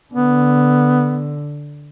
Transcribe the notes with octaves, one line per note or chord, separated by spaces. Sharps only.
D3 B3